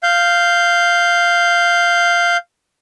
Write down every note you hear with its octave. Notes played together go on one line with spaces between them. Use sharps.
F5 G6